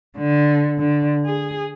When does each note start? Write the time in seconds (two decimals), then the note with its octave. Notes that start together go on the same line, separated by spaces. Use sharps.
0.18 D3
0.79 D3
1.26 G#4